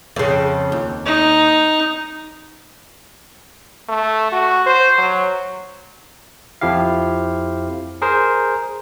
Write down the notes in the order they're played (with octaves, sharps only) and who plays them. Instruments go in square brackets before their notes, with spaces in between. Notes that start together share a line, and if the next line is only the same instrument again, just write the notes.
[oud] F2 C#3
D#2
[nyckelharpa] D#4
[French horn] A3
F#4
C5
F#3
[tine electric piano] F2 F3 E4 G4 F5
G#4 A#4 C5